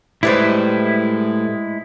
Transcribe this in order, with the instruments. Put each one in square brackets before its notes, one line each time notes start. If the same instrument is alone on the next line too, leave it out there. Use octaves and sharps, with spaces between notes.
[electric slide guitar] A2 [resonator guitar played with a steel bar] G3 B4 C5 [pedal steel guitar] G#3 E4